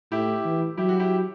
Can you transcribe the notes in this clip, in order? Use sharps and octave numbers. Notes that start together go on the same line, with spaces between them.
A2 E4 G4
E3
F#3 E4 G4
F#4
E4 G4